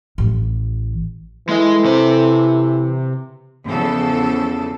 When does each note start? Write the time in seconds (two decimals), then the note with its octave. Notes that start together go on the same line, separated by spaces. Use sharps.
0.18 A1 E3
1.49 E3 G#3 A4 D#5
1.84 C3 C5
3.66 E2 C#3 F3 A4